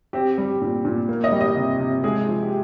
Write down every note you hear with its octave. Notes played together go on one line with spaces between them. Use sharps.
C4 G4
G3
A#2
A#2
A#3
D#5
G3
D#5
C3
C3
G#3 G#4
F3
G4